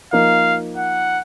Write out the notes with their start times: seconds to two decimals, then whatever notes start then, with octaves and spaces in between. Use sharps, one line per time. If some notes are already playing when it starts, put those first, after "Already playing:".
0.13 F3 A#3 D#4 F5
0.77 F#5